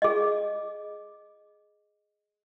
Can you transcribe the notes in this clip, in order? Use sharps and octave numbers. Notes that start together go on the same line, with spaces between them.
G#4 D#5